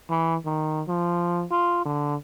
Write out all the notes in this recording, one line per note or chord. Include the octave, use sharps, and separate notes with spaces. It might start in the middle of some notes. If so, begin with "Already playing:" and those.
E3
D#3
F3
F4
D3